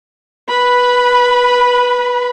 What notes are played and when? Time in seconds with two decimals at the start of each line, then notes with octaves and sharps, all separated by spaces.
0.48 B4 B5